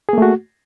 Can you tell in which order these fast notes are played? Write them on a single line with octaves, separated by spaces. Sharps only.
G#4 A#3 A3 F#4